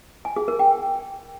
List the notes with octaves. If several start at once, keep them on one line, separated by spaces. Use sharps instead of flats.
G#5
G#4
A#4
G5